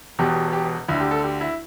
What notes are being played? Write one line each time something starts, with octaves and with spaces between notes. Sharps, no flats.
E1 E2 B2 G4
G4
D2 D3 E4
G4
A4
G4
E4